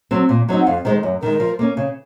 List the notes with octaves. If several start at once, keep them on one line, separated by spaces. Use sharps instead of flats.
F#3 C4
A#2
F#3 C4 D#4
F#5
F2 F5
D#3 G#3 C5
F#2
D#3 G#3 A#4
F3
A#3 C#4
C#3